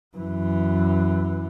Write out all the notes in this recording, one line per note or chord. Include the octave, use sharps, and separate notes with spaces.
F#2 E3